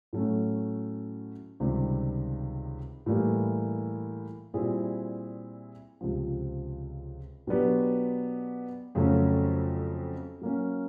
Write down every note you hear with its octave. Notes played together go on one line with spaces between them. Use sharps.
A2 F#3 A3 C#4
C#2 C3 D#3 G3
A2 E3 G3 A#3
A#2 G3 C4 E4 G#4
C#2 C3 F3
B2 F#3 B3 D4 G4
F2 C#3 F#3 A3 C#4
F#3 A#3 C#4